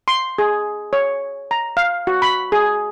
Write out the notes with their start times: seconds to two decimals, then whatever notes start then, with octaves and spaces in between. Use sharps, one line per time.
0.08 C6
0.38 G#4
0.93 C#5
1.51 A#5
1.77 F5
2.07 F#4
2.22 B5
2.52 G#4